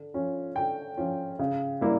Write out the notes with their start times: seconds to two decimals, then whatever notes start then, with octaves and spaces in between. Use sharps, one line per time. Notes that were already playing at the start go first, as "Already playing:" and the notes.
Already playing: D3
0.14 F3 C#4 F4
0.56 D3 G5
0.97 F3 C#4 F4
1.39 C#3
1.81 G3 A#3 E4